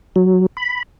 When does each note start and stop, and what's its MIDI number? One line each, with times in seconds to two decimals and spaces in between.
0.16 0.46 54
0.57 0.83 83